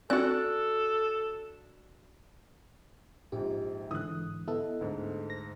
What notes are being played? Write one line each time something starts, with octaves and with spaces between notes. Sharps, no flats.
C4 D4 F#4 A4 F#6
A#1 G#2 G4
G#2 D3 E3 D#6 F#6
B3 E4 A4 D#5
D2 G#2
A#6